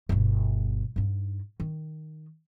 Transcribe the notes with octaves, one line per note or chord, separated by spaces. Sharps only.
G1 B2
G2 D#4
D#3